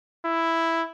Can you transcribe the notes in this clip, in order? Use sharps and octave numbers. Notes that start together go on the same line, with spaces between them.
E4